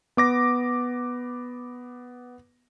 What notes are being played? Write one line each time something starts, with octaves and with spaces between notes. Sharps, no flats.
B3 D6 A#6